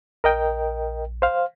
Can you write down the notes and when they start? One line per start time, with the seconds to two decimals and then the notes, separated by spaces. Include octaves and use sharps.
0.24 A#1 A#4 D#5 G5
1.22 C5 F5